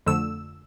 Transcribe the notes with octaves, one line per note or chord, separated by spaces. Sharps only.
F2 D3 A3 E6